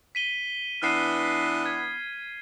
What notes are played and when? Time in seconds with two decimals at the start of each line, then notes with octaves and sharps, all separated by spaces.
0.15 B6 D#7 G7
0.82 E3 B3 D4 F6 C7 D#7
1.66 G#6